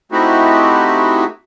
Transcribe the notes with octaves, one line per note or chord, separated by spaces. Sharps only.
A3 C4 D#4 E4 F#4 G4